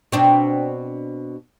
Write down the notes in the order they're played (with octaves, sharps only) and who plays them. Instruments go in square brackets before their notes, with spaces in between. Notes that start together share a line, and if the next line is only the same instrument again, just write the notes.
[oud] B2 C4 D4